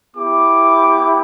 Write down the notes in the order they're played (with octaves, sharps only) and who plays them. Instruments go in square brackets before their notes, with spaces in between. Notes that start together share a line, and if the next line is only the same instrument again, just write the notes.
[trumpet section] B3 E4 G4 D6